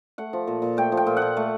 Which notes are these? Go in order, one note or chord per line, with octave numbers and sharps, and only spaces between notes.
A3 F#5
F3
A#2
A#2
A3 G5
F3
G5
A#2
F#5
A#2
A3